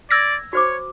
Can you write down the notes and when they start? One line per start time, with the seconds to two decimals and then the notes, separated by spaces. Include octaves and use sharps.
0.11 D5 E6 G#6 A#6
0.53 F#4 C5 C#5 D6